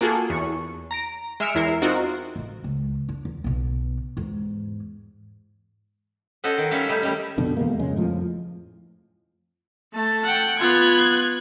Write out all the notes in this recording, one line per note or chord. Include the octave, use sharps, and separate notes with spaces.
A#3 F4 F#4 G#4 A4
E2 C#6
A#5 A#6 D7
G#3 E5 E6 F6 C#7 D7
E2 E4 A#4 C7
C4 D#4 F4 F#4 A#4
A1
C#2
D4
E2
B1 B2
E2 G#2
C#4 F#4 A4 C5 D#5 F#5
D#3
D#3 G3 C#4 E5 F5
G3 A3 D#4 E4 G4
D#3 G3 A3 C#4 D#4
F2 B2 D3
E2 B2 G#3 A#3
F2 C#3 G#3
F2 A2 F3
A3 A5
F#5 G5
B3 F4 F#6 G#6